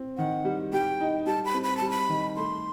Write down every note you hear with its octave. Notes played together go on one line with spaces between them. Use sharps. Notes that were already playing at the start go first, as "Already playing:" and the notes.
Already playing: C4
D#3 F#5
G3
G3 G5
D#4
G3 A5
B5
C4
B5
G3 A5
B5
D#3
A3 C6